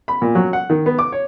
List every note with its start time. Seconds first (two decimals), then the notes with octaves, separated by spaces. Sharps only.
0.08 B5
0.22 A#2
0.35 F#3
0.53 F#5
0.70 D#3
0.86 B3
0.99 D6
1.12 C#5